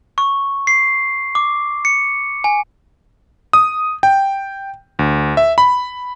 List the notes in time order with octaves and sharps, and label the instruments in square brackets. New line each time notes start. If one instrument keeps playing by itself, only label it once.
[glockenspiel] C#6
C7
D6
C#7
G#5
[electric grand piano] D#6
G5
D2
E5
B5